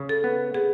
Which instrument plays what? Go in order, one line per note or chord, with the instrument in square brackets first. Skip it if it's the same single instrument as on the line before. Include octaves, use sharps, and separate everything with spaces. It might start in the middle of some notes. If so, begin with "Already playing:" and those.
Already playing: [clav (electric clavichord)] C#3
[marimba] A4
[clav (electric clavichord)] B3
[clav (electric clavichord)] B3 [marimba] G#4